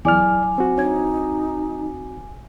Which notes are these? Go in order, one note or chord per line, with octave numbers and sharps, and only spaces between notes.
E2 F#3 E4 D5 G#5 D6 F6
C4 F#4
D4 D#4 C#5 G#6